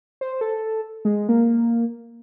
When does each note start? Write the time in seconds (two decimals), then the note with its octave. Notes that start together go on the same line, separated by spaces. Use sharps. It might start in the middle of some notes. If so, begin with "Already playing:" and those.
0.21 C5
0.41 A4
1.05 G#3
1.29 A#3